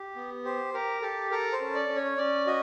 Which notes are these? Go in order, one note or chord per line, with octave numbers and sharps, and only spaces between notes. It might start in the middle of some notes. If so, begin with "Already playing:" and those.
Already playing: G4
B3
G4 C5
G4 A#4
G4 A4
A4 A#4
C5
C#4
D5
C#4
C#5
C#4 D5
F#4 D#5